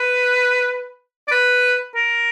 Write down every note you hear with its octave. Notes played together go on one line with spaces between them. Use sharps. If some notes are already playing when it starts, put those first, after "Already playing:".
Already playing: B4
D5
B4
A#4